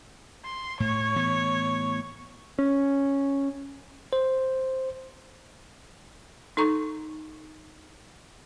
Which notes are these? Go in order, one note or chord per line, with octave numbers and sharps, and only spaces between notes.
C6
A2 C#5
A2 E3 B3
C#4
C5
D#4 A4 A#5 C#6